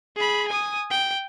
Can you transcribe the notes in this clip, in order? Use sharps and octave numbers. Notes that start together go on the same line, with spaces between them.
G#4 B5
G#5 D#6
G5